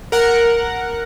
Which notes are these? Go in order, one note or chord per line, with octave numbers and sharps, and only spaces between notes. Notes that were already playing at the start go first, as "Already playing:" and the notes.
A#4 F#5